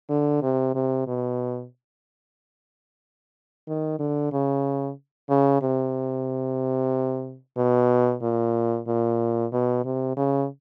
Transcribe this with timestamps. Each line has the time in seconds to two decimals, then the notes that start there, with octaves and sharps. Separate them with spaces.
0.09 D3
0.42 C3
0.74 C3
1.07 B2
3.67 D#3
3.99 D3
4.32 C#3
5.29 C#3
5.62 C3
7.57 B2
8.22 A#2
8.87 A#2
9.52 B2
9.85 C3
10.17 C#3